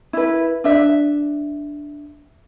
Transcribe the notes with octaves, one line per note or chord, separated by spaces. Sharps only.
E4 B4
D4 E5